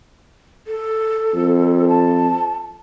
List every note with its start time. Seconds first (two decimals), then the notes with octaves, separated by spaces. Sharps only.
0.67 A4
1.34 F2
1.89 A5